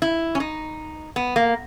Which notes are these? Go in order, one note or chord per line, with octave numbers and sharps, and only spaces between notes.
E4
C#4
D#4
B3
A#3